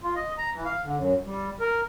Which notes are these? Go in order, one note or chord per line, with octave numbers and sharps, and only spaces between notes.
F4
D#5
A#5
E3
F5
D3
F#2
G3
A#4